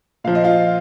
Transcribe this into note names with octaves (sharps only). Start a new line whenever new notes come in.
A#2 F3 F5
D#5
F4 F5